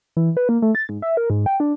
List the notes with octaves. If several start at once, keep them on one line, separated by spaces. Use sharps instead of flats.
E3
B4
A#3
A3
A6
G#2
E5
A#4
G#2
G5
D4